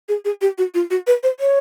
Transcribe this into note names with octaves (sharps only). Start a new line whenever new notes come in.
G#4
G#4
G4
F#4
F4
F#4
B4
C5
C#5